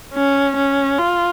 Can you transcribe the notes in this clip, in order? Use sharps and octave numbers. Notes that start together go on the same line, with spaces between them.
C#4
C#4
F4